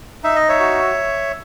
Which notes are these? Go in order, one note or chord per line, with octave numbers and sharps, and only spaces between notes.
D#4 E5
D#5
C#5 E5
F#4